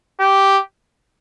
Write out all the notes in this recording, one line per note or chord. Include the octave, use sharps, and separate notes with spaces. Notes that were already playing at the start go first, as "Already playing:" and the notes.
G4